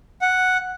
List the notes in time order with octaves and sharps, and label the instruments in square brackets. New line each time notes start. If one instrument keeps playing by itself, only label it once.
[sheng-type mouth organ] F#5